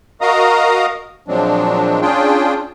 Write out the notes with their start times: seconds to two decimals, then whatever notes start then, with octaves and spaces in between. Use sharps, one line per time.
0.21 F#4 A#4 D#5 F5 A#5 D#6
1.28 A#2 F3 F#3 G#3 C4 D4
2.02 C#4 D4 F4 G#4 G5